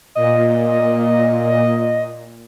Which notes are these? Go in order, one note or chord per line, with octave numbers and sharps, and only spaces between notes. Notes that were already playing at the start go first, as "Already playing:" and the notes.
A#2 D#5